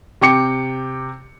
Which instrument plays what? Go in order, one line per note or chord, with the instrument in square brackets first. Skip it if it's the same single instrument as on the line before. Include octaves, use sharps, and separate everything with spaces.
[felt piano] C3 G5 D6 C#7